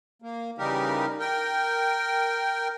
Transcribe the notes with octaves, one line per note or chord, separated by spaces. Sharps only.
A#3
C#3 E3 G3 D#4 G4 A#4
A#4 G5